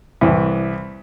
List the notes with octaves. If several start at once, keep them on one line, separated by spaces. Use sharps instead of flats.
C2 E3